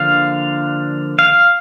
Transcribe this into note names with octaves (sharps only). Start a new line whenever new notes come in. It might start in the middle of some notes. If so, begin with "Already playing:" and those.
Already playing: D3 F3 A#3 D4 F5
F5